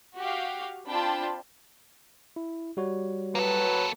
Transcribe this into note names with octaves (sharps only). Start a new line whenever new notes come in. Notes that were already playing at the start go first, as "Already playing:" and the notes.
F#4 G4 F5
C4 D4 F4 G5 A5 B5
E4
G3 F#4 C#5
A2 F#3 A#3 A4 B4